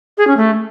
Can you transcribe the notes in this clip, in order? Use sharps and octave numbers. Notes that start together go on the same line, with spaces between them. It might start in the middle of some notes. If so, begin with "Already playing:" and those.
G#4
C#4
A3